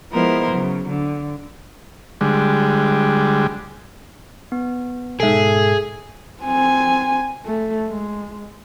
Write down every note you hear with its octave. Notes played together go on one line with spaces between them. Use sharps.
F3 G#3 B3 E4 A#4 C5
C#3 F#3
D3
D3 G3 G#3
B3
G#2 B2 G#4 A4 E5
C4 G#5
A3
G#3